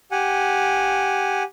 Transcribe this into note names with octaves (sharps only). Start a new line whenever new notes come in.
G4 F#5 G#5